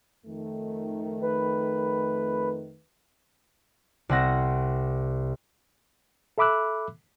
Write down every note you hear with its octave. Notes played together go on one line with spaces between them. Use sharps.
F2 D#3 A3
B4
C2 C4 F#5 A#6
A4 E5 B5 D6 E6 F#6